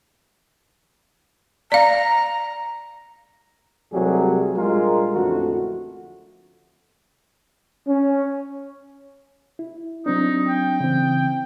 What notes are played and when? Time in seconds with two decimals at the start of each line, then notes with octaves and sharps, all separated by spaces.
1.72 D5 F5 A#5
3.93 C2 C3 F#3 G3 A3 G#4
4.56 A#1 G3 G#3 F4 A#4
5.15 A1 F2 D3 A3 F#4
7.87 C#4
9.59 E4
10.06 F#3 C4 D4 D#4
10.48 G5
10.80 C#3 E3 C4